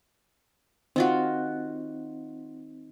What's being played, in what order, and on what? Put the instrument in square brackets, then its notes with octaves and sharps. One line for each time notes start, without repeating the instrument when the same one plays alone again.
[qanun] D#3 F4 F#4 [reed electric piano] C4